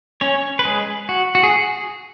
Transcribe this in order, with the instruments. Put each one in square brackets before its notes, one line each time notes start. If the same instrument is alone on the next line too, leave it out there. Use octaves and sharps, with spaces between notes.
[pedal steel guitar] C#4 C#5
B4
G#3 G#4
F#4
F#4
G#4